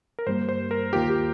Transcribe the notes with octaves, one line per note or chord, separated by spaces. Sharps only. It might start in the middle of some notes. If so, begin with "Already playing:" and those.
A#4
G2 G3 A#3 C5
C5
A#4
D#2 D#3 A#3 F4 G4 A#4
G4